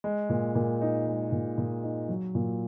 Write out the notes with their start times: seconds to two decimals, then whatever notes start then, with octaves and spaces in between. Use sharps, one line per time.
0.04 G#3
0.29 A#2
0.55 A#2
0.81 D#4
1.07 G#3
1.32 A#2
1.58 A#2
1.83 D#4
2.09 F#3
2.35 A#2